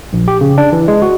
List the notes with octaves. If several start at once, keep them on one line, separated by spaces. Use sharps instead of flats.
A#1
G4
C#3
D4
E3
G#3
F#4